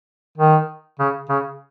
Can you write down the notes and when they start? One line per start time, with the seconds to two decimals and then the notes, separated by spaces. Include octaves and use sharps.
0.38 D#3
0.99 C#3
1.29 C#3